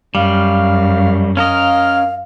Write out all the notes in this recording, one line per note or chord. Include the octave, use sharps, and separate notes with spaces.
F#2 G3 F5
C#4 A#4 D#5 F5 F6